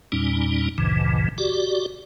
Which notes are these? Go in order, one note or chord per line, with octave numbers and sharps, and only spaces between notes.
E2 A#2 G3 C#4 D#4
G#1 D2 G2 A#2 C#3 E3
F#4 G4 D5